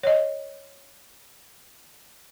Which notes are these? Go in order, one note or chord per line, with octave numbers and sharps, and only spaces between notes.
C#5 D#5